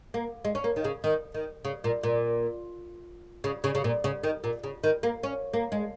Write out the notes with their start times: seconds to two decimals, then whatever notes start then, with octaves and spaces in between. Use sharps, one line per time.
0.14 A#3
0.45 G#3
0.55 C#4
0.64 A#3
0.76 D#3
0.84 C#3
1.04 D#3
1.34 D#3
1.65 C#3
1.84 A#2
2.03 A#2
3.44 C#3
3.64 C#3
3.75 C#3
3.84 A#2
4.04 C#3
4.23 D#3
4.44 A#2
4.64 C#3
4.84 D#3
5.03 A#3
5.23 C#4
5.54 A#3
5.72 G#3